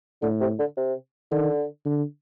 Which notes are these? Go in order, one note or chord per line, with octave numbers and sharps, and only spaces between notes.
A2 D3
C3
D3
C3
D3 D#3
D3